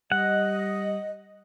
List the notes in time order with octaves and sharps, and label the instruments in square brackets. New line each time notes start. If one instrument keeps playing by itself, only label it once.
[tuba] G3 [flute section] D#5 [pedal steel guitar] F#5